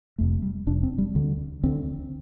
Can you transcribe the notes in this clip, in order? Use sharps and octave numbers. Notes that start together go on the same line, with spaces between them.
F1 F2 C3 A3
G3
F1 F2 C3 D4
C4
G3
D2 D3
D2 D3 C4